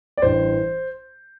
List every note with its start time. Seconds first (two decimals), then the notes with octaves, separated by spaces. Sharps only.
0.17 D5
0.22 A1 G2 E3 C5